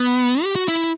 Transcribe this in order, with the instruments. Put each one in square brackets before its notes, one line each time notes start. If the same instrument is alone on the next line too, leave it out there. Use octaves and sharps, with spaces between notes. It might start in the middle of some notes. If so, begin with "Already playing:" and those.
Already playing: [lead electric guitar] B3
G4
F#4
E4